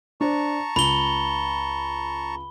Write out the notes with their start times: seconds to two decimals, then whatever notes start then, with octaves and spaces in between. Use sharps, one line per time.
0.21 D4 C5 D5 A5 A#5 C#6
0.76 C#2 B5 G7